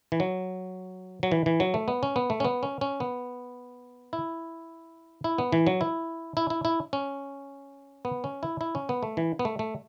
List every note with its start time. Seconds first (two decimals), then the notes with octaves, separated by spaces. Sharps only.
0.12 E3
0.20 F#3
1.23 F#3
1.32 E3
1.46 E3
1.60 F#3
1.74 A3
1.88 B3
2.03 C#4
2.16 B3
2.30 A3
2.40 C#4
2.44 B3
2.63 C#4
2.81 C#4
3.00 B3
4.13 E4
5.24 E4
5.38 B3
5.52 E3
5.67 F#3
5.81 E4
6.37 E4
6.50 E4
6.65 E4
6.93 C#4
8.05 B3
8.24 C#4
8.43 E4
8.61 E4
8.75 C#4
8.89 B3
9.03 A3
9.17 E3
9.39 B3
9.45 A3
9.59 A3